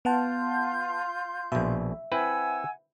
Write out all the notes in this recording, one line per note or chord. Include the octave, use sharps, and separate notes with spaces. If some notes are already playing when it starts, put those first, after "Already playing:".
B3 F4 F#5 A5 C6 G6
A#1 B2 E5
C4 E4 B4 F#5 G#5 E6